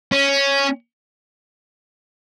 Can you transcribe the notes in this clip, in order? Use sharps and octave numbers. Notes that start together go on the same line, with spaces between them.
C#4